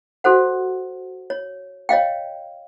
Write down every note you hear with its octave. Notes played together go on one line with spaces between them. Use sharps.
F#4 A4 C5 F#5
C#5
C#5 D#5 F5 G5